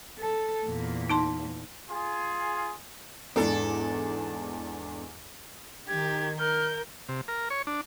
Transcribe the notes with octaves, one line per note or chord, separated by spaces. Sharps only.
A4
E2 A#2
D#4 A5 C6
F4 G#4
E2 G#2 D4 A4
D#3 G4 G#6
A#4 F6 G6
C3
A#4
C#5
D4